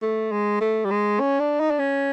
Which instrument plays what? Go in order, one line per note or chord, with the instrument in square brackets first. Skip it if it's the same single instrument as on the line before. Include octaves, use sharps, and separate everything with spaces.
[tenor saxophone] A3
G#3
A3
G3
G#3
C#4
D4
D#4
D4
C#4